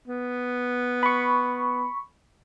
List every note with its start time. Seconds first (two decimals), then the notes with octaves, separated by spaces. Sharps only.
0.07 B3
1.03 B5 C#6